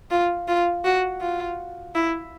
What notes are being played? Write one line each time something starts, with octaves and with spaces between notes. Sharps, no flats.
F4
F4
F#4
F4
E4